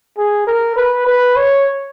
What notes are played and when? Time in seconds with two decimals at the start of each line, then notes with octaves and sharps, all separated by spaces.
0.18 G#4
0.47 A#4
0.76 B4
1.06 B4
1.36 C#5